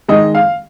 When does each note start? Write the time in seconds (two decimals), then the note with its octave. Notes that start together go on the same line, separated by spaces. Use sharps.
0.08 D#3 G#3 D#5
0.35 F5